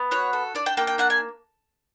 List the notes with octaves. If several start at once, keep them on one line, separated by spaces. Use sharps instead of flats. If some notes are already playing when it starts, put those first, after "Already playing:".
Already playing: B3
F#4 C#5
A4
D4 D5
G5
A#3 G5
G5
D4 F#5
G#5